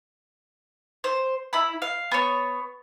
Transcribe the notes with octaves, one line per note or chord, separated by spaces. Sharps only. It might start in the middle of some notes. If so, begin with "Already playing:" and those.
C5
E4 B5
F5
B3 C#5